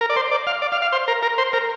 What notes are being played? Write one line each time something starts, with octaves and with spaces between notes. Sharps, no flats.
A#4
D5
C5
D5
F5
D5
F5
F5
C5
A#4
A#4
C5
A#4